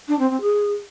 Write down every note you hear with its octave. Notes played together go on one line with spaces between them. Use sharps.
D4
C4
C4
G#4